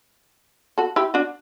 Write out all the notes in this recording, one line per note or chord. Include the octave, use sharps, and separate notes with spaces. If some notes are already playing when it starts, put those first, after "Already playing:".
F#4 A4
E4 G4
D4 F#4